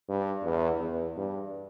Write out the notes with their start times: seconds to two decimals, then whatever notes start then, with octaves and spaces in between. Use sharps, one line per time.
0.09 G2
0.44 E2
0.80 E2
1.17 G2